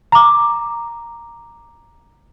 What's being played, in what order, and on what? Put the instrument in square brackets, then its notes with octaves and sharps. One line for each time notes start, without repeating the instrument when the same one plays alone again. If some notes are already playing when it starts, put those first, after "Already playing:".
[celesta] A#5 D6